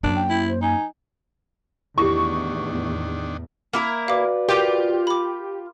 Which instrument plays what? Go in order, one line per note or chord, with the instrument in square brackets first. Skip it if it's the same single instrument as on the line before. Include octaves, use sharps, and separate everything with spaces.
[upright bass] F#2 A#3 [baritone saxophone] D4
[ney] G5
[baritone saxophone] E4
[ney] C5
[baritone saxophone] D#4 [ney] G#5
[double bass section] E2 A2 [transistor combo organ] D#3 D4 [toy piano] E4 G4 [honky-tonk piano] C#6
[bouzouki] A#3 E4 A#4
[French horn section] F#4 B4 D5 [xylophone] F5 D6
[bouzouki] F4 [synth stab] G4 [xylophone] A#4 D6
[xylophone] B5 D6